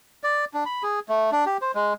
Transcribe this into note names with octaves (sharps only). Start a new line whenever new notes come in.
D5
D4
B5
G#4
A3
D4
G4
C5
G#3